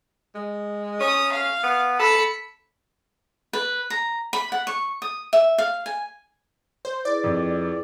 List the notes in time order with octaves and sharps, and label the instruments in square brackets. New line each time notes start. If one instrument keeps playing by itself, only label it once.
[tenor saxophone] G#3
[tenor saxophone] C#4 [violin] D#6
[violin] F5
[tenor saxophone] B3
[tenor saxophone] A4 [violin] B5 C#7
[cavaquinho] B4
A#5
B5
F#5
C#6
D#6
E5
F5
G#5
[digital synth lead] C5
[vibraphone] E4 G#4 B4 [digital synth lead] D5
[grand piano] F2